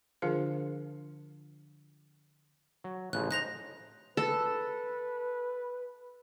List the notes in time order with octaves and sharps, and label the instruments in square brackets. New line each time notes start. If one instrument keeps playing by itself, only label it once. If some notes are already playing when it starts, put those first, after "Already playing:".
[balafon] D3 F3 D4 F4 A#4 F5
[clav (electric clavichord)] F#3
[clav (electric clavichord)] A1 C#3 F3 [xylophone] F#6
[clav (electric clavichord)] D#4 C5 [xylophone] F#6 A#6 F7
[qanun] A4 [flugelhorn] B4